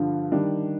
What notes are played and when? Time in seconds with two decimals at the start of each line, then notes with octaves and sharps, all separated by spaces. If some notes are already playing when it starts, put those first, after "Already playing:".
Already playing: G2 D3 F3
0.32 D#3 G3 D4